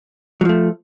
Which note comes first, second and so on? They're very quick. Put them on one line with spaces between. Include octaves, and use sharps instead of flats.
F#3 F3 A3